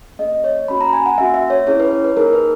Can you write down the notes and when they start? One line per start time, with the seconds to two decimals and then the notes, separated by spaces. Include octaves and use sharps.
0.19 A#3 C#4 G#4 D#5
0.44 C#5
0.68 A#3 C#4 F#4 B5
0.81 A#5
0.93 G#5
1.06 F#5
1.18 A#3 C#4 F#4 E5
1.34 E5
1.50 C#5
1.67 C#4 E4 G#4 C#5
1.80 B4
1.91 C#5
2.04 B4
2.17 A#3 D#4 G#4 A#4
2.33 B4